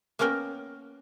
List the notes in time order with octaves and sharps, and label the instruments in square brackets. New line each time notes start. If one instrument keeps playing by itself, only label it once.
[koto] A#3 B3 C#4 A#4 G5